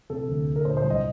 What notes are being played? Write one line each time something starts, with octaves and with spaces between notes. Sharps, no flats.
C3 A4
D2
D2
A#4
A#2 C5
C5
C2
D#5